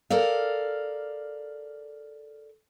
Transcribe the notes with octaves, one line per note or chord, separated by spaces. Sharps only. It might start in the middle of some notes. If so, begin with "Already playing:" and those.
A4 A#4 D5 F5